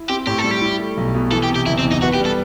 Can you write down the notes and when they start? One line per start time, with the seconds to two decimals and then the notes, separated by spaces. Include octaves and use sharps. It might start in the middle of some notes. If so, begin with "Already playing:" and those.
Already playing: E4
0.09 C4 G4
0.27 A2 G4
0.38 A4
0.44 G3
0.51 G4
0.61 E4
0.79 A3
0.97 B1
1.14 B2
1.32 E3 A4
1.43 G4
1.50 C3
1.56 G4
1.67 F#1 E4
1.79 C4
1.85 E2
1.91 D#4
2.02 B3 F#4
2.14 G4
2.20 G3
2.25 A4